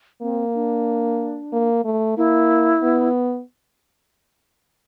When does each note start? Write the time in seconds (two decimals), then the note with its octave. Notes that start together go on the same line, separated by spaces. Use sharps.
0.22 A#3 C4
0.55 D4
1.52 A#3
1.85 A3
2.17 A#3 E4
2.82 B3